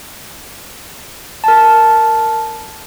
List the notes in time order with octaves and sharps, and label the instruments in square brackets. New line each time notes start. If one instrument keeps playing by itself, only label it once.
[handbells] A#4 A5